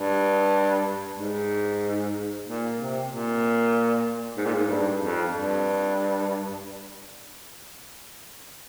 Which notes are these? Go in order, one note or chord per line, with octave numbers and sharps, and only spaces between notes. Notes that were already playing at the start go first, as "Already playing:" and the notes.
Already playing: G2
G#2
A#2
C3
A#2
G#2
A#2
G#2
G2
F2
G2